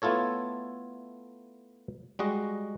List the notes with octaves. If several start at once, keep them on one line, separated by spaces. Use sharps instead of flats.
A3 B3 E4 F4 A4 C#5
G3 G#3 F#4 D#5